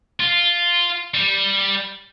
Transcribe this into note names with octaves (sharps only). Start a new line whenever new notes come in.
F4
G3